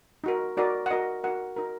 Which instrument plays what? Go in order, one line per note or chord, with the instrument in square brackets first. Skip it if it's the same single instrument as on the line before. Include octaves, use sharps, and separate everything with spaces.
[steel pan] D#4 F#4 A#4
D#4 F#4 A#4 D5
F#5
D#4 F#4 A#4 D#5
D#4 F#4 A#4 F#5
D#4 F#4 A#4